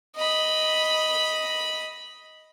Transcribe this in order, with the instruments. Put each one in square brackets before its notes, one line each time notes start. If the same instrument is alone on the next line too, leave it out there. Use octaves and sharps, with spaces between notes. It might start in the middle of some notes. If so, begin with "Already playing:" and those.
[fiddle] D#5 B5